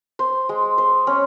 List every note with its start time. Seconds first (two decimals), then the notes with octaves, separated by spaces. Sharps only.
0.19 C5
0.49 G#3
0.78 C5
1.07 C#4